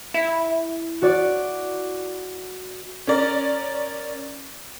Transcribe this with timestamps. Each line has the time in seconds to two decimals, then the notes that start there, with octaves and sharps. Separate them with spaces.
0.14 E4
1.02 F#4 D5
3.07 C#4 A#4 D5